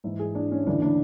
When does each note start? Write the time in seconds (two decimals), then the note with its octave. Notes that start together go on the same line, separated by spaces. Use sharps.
0.04 G#2 E3 E4
0.19 G#4
0.35 D4
0.51 C#4
0.67 D2 C#3 E3 D4
0.82 D4